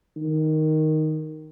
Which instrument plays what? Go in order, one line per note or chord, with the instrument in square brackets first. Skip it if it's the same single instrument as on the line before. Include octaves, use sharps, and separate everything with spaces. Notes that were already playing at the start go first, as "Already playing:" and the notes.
[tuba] D#3